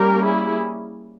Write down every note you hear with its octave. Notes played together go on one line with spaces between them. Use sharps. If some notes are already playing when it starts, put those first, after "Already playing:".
Already playing: G3 A#3 C#4 G4 A#4
E4 G#4